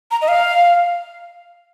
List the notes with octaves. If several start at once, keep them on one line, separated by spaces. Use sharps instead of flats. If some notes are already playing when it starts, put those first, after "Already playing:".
A#5
D#5
F5